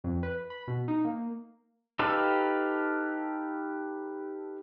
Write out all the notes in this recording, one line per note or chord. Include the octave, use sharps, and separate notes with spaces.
F2
B4
B5
B2
D#4
A#3
D#4 G4 A4 B4 F5